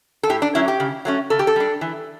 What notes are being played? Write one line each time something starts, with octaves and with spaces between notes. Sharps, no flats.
A4
A2 G4
D4
F#3 C#4 E4
G4
C#3
F#3 A3 C#4
C#3 A4
G4
A4
G3 D4
E3